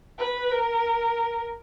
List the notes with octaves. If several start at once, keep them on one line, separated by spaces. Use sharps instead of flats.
B4
A#4